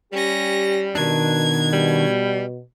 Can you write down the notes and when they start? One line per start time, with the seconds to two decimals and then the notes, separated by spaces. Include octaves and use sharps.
0.12 G3 C#4 G4 A#6
0.95 B2 D#3 D4 G#6
1.73 G3